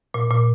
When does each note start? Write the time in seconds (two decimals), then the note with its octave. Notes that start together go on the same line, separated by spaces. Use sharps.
0.14 A#2
0.31 A#2